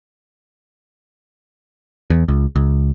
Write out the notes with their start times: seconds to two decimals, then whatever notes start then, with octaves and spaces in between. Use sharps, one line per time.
2.10 E2
2.28 C#2
2.56 C#2